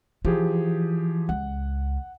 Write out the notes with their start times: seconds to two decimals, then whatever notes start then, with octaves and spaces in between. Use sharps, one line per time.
0.25 E3 F3 G4 G#4
1.29 C#2 F#5